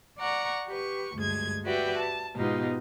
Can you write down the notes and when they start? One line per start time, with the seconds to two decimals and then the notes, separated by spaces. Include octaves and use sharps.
0.19 D5 F#5 A#5 C#6
0.68 G4 B4 C#6
1.15 D2 G2 G#3 G#6
1.65 F#4 G4 B4 D5 E5 G5
1.97 A5
2.36 G#2 B2 B3 D#4 F4 G4